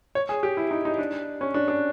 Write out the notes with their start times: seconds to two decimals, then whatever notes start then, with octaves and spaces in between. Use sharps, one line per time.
0.15 C#5
0.29 G#4
0.43 G4
0.57 E4
0.71 D#4
0.85 D#4
0.98 D4
1.41 C#4
1.54 D4
1.68 D4